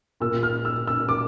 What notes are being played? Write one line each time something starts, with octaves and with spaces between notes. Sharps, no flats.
A#2 E6
F6
E6
E6
D6